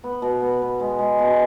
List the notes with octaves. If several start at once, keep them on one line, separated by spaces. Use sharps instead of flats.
B3
B2
B3
B3
G#3
G#3
B2